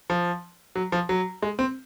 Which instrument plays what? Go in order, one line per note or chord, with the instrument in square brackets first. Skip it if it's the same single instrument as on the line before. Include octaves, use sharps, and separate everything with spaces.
[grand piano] F3
F#3
F3
F#3
G#3
C4